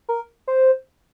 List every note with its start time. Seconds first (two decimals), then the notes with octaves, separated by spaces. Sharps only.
0.09 A#4
0.48 C5